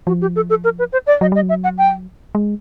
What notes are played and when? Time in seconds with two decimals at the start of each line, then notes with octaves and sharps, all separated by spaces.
0.07 F3 F#4
0.21 G4
0.36 A4
0.50 A4
0.64 A#4
0.79 B4
0.92 C5
1.07 D5
1.21 F#3 D#5
1.32 G3 D#5
1.43 F#3
1.49 E5
1.64 F#5
1.78 G5
2.35 G#3